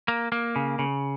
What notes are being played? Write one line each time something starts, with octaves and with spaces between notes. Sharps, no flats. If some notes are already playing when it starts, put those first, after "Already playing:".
A#3
A#3
C#3
C#3